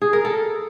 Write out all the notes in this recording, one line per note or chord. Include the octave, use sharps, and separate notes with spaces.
G#4
A#4
A4